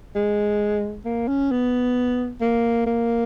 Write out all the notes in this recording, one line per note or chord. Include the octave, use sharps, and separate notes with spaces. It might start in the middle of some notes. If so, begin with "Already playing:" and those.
G#3
A#3
C#4
B3
A#3
A#3